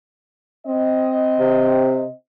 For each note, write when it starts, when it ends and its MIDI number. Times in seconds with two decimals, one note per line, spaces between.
0.67 2.13 60
0.67 2.13 75
1.40 2.07 48